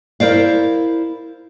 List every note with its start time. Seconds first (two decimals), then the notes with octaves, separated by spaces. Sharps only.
0.20 E4 A#4 C5 D5 F5